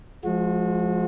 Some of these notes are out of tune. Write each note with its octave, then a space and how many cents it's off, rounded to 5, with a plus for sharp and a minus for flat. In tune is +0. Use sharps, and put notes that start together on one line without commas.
F3 +0 G#3 +20 F#4 -30